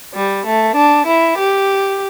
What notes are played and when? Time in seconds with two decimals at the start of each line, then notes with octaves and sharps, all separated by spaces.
0.14 G3
0.44 A3
0.75 D4
1.05 E4
1.36 G4